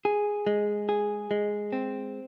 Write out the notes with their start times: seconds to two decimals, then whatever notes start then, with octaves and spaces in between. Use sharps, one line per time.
0.05 G#4
0.47 G#3
0.89 G#4
1.31 G#3
1.73 C4